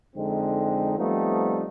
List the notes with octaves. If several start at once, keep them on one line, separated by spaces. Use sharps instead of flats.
F2 D3 G#3 C4 D#4
F3 G3 A3 B3 C4 D#4